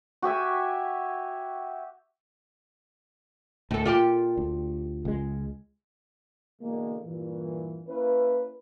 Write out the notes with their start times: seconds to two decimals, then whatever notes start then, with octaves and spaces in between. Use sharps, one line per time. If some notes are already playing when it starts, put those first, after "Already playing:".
0.22 F#4 G4 E5 G#5
3.71 D2 A2 A4
3.85 A#2 F4 G4
4.37 D2
5.05 C#2 G#3
6.62 B2 D3 E3 G#3 A#3
7.04 G2 A#2 E3
7.88 A#3 C#4 E4 B4